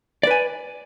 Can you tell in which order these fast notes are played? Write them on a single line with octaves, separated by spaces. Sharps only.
D5 B4 G#5